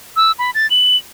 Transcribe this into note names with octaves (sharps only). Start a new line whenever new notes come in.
E6
B5
A6
F#7